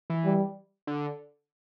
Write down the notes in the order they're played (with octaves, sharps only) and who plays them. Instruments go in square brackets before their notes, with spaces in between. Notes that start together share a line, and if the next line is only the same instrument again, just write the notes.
[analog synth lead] E3
[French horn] G3
[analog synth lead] D3